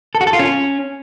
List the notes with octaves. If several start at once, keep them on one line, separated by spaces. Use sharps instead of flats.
A4
F#4
A4
F4
C#4